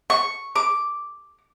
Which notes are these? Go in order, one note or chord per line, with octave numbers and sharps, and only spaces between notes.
C#6
D6